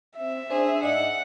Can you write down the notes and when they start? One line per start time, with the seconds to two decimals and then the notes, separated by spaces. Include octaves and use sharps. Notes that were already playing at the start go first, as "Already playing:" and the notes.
0.17 C4 E5
0.50 D4 G#4 C5 D5
0.83 G#2 D5 D#5 F#5